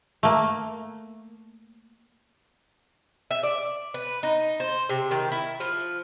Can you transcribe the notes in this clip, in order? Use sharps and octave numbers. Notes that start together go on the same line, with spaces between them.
A3 A#3
E5
D5
B4
D#4
C5
C3
D#3
E4
F3